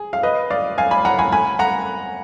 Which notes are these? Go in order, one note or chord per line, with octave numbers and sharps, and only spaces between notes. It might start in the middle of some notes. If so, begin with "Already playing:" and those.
Already playing: G#4
F5
B4 D#5
D5 F5
F5 G#5
G#5 B5
F#5 A#5
G#5 B5
G#5 B5
F#5 A#5